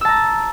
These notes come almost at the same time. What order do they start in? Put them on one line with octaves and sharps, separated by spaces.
E6 A5 A#5